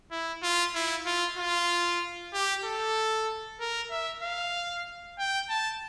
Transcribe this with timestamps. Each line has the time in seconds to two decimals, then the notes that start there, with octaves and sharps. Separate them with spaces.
0.11 E4
0.43 F4
0.74 E4
1.06 F4
1.38 F4
2.33 G4
2.64 A4
3.60 A#4
3.91 E5
4.23 F5
5.19 G5
5.49 A5